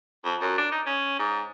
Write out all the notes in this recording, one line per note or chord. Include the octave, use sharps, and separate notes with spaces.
F2
F#2
D4
D#4
C#4
G#2